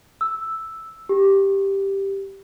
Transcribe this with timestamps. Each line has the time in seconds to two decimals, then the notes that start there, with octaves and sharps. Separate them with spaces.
0.21 E6
1.09 G4